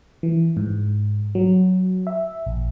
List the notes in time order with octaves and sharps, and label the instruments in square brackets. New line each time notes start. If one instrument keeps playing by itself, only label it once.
[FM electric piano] E3
G#2
F#3
E5
A#1